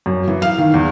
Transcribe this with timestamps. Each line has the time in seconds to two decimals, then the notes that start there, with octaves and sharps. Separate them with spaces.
0.06 F#2
0.28 E3
0.42 F5
0.58 D#3
0.74 E2